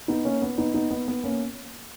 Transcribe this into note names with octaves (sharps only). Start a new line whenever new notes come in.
B3 D#4
A#3 C#4
B3
B3 D#4
B3 D#4
B3
B3
A#3 C#4